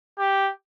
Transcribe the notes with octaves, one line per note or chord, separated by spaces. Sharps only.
G4